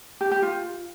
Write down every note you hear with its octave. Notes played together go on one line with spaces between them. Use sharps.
G4
G4
F4